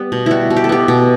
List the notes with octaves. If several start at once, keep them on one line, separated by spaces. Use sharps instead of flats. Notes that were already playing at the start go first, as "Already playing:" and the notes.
Already playing: G3 B3 G4
B2
G3 E4 F#4
B2
G4
A4
B3 G4
B2